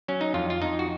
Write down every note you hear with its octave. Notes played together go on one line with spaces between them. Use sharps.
F#3 C#4
D#4
F2 F4
F4
F2 D#4
F#4